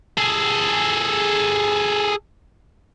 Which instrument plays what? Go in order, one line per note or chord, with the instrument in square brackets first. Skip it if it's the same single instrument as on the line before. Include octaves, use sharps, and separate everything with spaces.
[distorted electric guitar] G#4 A4